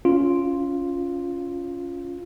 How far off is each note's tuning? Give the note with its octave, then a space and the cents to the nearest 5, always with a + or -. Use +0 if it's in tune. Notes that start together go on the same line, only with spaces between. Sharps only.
C#4 +15 F4 +0